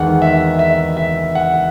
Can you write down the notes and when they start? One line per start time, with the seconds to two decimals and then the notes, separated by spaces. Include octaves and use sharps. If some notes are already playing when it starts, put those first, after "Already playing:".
Already playing: E2 D#3 G#3 D#4 F#5
0.22 E5
0.59 E5
0.97 E5
1.35 F#5